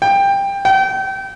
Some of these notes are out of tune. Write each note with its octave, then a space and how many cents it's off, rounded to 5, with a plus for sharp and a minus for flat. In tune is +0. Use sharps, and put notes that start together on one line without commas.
G5 +15
G5 -30